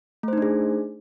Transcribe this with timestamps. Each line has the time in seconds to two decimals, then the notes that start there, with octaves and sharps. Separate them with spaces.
0.23 A3
0.28 C5
0.33 D#4
0.38 D4
0.42 G#4